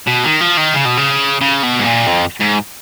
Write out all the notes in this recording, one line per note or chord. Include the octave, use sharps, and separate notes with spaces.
B2
D#3
F3
D#3
C#3
B2
C#3
C#3
B2
G#2
A#2
F2
G#2